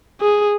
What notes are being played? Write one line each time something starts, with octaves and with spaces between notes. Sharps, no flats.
G#4